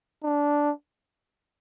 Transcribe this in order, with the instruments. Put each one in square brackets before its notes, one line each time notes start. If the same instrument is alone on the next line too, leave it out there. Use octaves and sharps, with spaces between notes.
[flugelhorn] D4